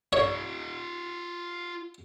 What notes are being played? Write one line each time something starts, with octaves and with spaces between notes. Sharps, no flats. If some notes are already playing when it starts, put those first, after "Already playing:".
F4 C#5 E5